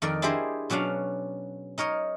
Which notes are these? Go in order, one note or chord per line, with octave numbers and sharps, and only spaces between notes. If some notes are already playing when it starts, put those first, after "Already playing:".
F2 D#3 A#4 D5
D4 E4 G4 G#4 C5 D#5
B2 F#3 C#4 D4 F5
D#4 A#4 C#5 D#5